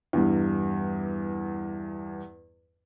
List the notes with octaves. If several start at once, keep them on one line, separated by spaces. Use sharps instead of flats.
E2 G2